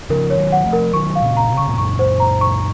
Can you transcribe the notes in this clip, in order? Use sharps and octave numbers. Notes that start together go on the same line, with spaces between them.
C#3 F3 A#4
C#5
D#3 F#3
F#5
F3 A3
A#4
D#3 F#3 C#6
F5
A#2 C#3
A#5
C3
C#3 C#6
A2 C3
F#2 A#2 C#6
C5
A#5
C#6